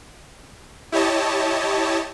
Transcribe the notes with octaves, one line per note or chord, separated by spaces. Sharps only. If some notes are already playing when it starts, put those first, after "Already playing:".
E4 G4 C#5 D#5 A5